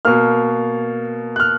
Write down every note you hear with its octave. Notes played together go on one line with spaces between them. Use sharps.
B2 A#3 F6
F#6
F6